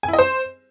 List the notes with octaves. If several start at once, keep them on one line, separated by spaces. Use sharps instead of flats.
G#5
E4
D#5
C5